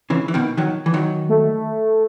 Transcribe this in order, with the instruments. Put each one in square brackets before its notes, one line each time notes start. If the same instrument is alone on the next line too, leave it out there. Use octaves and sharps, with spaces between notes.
[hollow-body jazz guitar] C#3 E3
E3
B2 D#3
D#3 F#3
E3
D#3 F#3
[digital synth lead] A3